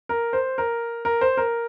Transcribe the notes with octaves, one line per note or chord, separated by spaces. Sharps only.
A#4
C5
A#4
A#4
C5
A#4